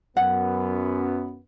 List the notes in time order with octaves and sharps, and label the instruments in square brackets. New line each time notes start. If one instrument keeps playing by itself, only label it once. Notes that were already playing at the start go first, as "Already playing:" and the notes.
[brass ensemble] F#2 B3 [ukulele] F#5